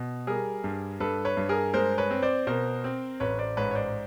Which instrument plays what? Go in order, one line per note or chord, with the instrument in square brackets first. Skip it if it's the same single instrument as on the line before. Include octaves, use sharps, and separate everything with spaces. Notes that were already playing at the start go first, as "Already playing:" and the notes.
Already playing: [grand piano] B2
G3 G#4 A#4
G2
G2 A4 B4
B4 C#5
G2
G#4 A#4
G#3 A#4 C5
B4 C#5
C4
C5 D5
B2 A#4 C5
C4
A1 B4 C#5
C5 D5
G#2 B4 C#5
C#5
C5 D5